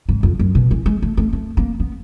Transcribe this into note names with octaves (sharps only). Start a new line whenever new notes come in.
G#2
F2
F#2
B2
E3
G#3
A3
A3
A3
A#3
B3